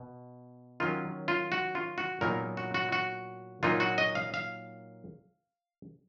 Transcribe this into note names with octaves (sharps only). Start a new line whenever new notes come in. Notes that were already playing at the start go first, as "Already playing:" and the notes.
Already playing: B2
D#3 F#3 C#4 F4
F4
F#4
F4
F#4
A#2 F#3 B3 D#4 A#4
F#4
F#4
F#4
A#2 F#3 A#3 D#4 F4
F#4
D#5
F5
F5